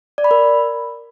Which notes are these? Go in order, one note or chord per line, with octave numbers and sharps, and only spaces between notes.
D5
B5
A#4